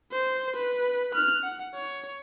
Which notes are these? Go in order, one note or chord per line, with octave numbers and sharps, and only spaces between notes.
C5
B4
F6 F#6
F#5
C#5